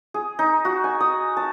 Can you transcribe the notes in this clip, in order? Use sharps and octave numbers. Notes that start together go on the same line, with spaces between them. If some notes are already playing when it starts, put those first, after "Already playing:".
G#4
D#4
F#4
G#5
D#6
A5